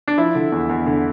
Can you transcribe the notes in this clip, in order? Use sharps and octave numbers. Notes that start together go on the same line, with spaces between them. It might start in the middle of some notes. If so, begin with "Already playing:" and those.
D4
F3 E4
D3
E2
E2
D3